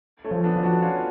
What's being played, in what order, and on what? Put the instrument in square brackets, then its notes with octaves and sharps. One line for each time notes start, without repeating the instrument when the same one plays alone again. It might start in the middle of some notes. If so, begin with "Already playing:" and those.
[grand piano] A3 C#4
[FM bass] F3
[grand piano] B3 D4
[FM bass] F3
[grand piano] D4 F#4
C#4 F4